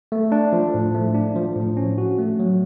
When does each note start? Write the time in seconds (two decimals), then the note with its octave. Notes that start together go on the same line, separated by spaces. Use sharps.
0.12 A3
0.32 D4
0.53 F3
0.74 A2
0.95 A3
1.14 D4
1.36 F3
1.56 A2
1.77 C#4
1.98 F#4
2.19 A3
2.39 F#3